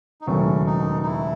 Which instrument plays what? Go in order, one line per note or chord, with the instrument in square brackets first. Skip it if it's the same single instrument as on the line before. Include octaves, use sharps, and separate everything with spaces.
[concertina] D#4
[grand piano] E1 D#2 C#3 F#3 A3 [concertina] C#4
[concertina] D#4
D#4
E4